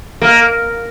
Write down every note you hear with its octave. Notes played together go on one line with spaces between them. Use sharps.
A#3